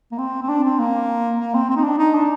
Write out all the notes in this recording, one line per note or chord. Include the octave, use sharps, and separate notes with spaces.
A#3
C4
C4
D4
C4
A#3
A#3
C4
C4
D#4
D4
D#4
D4